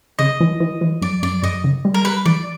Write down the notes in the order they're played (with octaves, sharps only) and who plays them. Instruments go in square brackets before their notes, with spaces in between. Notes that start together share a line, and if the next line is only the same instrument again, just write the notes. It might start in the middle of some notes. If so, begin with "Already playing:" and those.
[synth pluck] C#3 [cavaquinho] D#5
[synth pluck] E3
E3
E3
[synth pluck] F#2 [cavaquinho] D5
[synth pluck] F#2 [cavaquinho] D5
[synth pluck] F#2 [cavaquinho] D#5
[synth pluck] C#3
G3
[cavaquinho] A#4
[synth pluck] G3 [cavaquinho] B4
[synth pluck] E3 [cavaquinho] D5